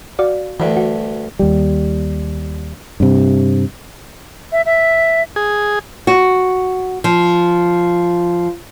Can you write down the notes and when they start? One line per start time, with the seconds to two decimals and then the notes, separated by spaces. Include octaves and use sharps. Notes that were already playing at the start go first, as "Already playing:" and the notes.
0.19 F#4 D5 F5
0.60 D2 G2 E3
0.77 F#4
1.39 D#2 G3
3.00 G2 C3
4.52 E5
4.66 E5
5.36 G#4
6.07 F#4
7.04 F3